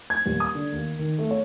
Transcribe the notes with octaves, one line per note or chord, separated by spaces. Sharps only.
G#6
D#1
D#6
D3
D#2
D#3
A3
C#5